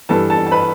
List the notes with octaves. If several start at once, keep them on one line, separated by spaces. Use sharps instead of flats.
G2 E3 A4 A5
A4 A5
A5
B4 B5